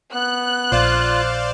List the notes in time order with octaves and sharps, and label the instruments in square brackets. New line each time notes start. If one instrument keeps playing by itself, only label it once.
[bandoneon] B3 [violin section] F#6
[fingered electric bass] A#1 [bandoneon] F4 [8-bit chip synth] C5 D5 F5